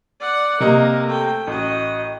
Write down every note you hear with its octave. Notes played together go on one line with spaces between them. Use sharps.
D5 F#5
C3 A#3 A#4 D#5
A3 G5
A1 F#4 D#5